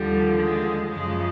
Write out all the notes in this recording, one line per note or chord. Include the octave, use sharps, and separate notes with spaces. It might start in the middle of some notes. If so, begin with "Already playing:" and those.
Already playing: D#2 D3 F3 G3
G#3
F#2 C#3 F3 G#3